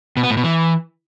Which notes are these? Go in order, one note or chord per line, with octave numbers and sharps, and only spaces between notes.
B2
B3
A2
B2
E3